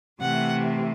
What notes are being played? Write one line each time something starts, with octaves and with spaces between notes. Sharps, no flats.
C3 E3 A3 F#5